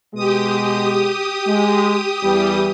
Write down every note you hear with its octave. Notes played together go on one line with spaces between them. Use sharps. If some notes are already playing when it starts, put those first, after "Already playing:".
B2 G#3 G4 D#6
G#3
E2 E3 G3